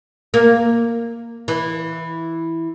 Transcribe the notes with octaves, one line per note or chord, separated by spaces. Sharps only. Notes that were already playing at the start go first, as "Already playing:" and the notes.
A#3
E3